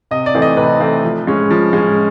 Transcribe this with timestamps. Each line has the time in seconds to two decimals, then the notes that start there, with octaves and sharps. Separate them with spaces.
0.11 C3 D#5
0.26 D5
0.34 E3 A3 C4 D#4
0.42 D#5
0.57 C3 B4
0.80 E3 A3 C4 D#4
1.04 F3
1.27 G#3 C#4
1.50 F3
1.73 G#3 C#4